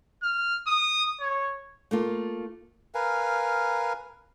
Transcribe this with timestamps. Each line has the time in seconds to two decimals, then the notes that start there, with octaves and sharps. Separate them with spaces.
0.23 F6
0.67 D#6
1.20 C#5
1.91 A3 A#3 F4
2.94 A#4 B4 F5 G#5